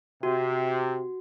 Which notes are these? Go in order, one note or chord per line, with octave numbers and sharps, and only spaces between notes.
C3 F#4